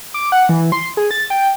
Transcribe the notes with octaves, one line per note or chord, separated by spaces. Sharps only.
D6
F#5
E3
C6
G#4
A6
G5